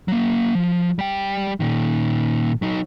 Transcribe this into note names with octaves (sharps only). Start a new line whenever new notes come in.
F#3 A#3
F3
G3 G5
A#2 D#3
F#3 D#4